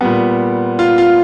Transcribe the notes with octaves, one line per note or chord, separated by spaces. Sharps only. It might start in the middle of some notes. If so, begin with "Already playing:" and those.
A#2 G3 B3
F4
F4